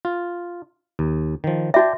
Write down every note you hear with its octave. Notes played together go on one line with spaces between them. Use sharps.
F4
D#2
D#3 F3
F#4 D5 E5 G5 A5